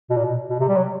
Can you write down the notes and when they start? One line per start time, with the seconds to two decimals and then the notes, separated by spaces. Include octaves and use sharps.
0.10 B2
0.17 A#2
0.24 B2
0.49 B2
0.60 C3
0.69 G3
0.76 F#3